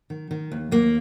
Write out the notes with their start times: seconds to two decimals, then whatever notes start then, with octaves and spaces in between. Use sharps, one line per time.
0.10 D#3
0.31 D#3
0.52 D#2
0.71 D#2 A#3